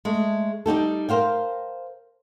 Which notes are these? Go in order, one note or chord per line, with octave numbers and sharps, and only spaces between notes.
G#3 A3
G3 D#4 G4 A4
A#4 C5 F5 G5